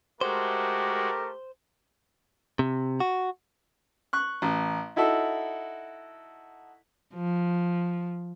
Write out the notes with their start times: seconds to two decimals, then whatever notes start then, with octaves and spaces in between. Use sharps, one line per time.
0.21 G#3 A3 F#4 G4 A#4 C5
2.59 C3
3.00 F#4
4.13 C#6 F#6
4.42 A1
4.96 D#4 E4 F#4 A4
7.14 F3